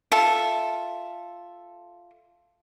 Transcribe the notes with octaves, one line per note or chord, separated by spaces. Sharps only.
F4 A4 E5